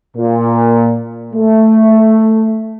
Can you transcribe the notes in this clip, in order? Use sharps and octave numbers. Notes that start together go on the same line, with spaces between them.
A#2
A3